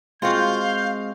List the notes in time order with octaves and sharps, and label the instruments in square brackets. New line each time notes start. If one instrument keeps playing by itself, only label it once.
[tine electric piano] G#3 C4 [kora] F4 F#4 [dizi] F5 [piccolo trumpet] G6